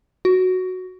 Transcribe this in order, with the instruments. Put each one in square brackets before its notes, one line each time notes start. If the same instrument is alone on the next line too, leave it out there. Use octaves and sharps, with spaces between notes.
[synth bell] F#4